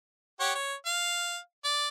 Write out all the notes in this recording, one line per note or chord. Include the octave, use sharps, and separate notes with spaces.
G4 C#5 F#5
C#5
F5
D5